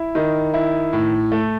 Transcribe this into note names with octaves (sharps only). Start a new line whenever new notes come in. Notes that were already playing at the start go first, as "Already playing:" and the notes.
Already playing: E4
D#3
E4
A2
A3